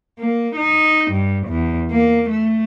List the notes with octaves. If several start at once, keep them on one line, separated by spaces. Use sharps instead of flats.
A#3
D#4
G2
E2
A#3
A3